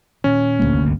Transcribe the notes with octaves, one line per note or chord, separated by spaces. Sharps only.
A#2 D#3 C#4
D2 G#3 A#3
F1
G1 C2 C3